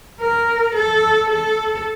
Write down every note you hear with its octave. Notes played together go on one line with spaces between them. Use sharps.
A#4
A4
A4